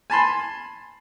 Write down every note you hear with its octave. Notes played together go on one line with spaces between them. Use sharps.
G#5 A5 B5 C6